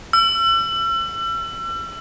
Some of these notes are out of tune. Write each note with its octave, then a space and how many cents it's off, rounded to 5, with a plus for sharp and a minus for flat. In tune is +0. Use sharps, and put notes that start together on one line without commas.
E6 +40